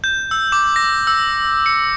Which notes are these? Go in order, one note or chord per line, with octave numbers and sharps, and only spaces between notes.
G6
E6
D6
A#6
E6
C#7